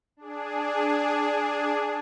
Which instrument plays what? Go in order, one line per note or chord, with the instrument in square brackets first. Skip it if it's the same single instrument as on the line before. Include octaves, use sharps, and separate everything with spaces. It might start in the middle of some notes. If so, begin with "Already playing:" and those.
[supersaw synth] D4 G#4